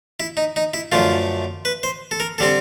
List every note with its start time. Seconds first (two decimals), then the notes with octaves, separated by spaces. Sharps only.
0.20 E4
0.37 D#4
0.56 D#4
0.74 E4
0.92 F#2 D3 F3 A3 F4
1.65 B4
1.83 C5
2.11 A4
2.20 A#4
2.38 D3 G3 C4 A4